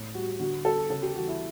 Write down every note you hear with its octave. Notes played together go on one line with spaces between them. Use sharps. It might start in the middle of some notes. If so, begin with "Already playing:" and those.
Already playing: A2
G3 F#4
D3 F#4
G3 A4
C#3 A4
G4
E3 G3 F#4
E4